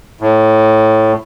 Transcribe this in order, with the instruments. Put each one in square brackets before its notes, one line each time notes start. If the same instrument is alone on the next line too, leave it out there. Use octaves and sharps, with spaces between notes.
[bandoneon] A2